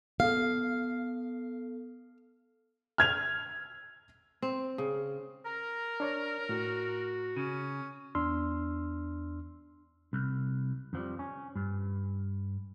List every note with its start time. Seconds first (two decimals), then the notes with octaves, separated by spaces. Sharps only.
0.20 B3 A4 F5
2.98 F6 G#6 F7
4.42 C4
4.78 C#3
5.46 A#4 A#5
6.00 D4 C#5 D5
6.49 A2 F#4
7.36 C#3 C#4
8.15 E2 D4 C6 E6 F6
10.13 C2
10.93 F2 F3 G3
11.19 C#4
11.56 G2